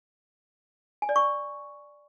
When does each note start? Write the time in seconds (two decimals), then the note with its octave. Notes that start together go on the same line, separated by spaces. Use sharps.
1.02 G#5
1.09 D5
1.16 C#6